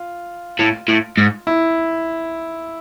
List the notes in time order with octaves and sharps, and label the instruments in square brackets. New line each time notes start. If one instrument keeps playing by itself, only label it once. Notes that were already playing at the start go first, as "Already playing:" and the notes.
Already playing: [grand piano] F4
[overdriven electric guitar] A2
A2
G#2
[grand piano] E4